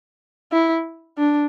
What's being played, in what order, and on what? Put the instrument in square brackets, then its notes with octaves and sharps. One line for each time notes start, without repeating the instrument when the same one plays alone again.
[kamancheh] E4
D4